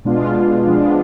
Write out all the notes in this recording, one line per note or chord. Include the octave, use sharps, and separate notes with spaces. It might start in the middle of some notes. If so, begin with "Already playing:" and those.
B2 G#3 B3 D4 F4
F3 G#3 B3 D4 F4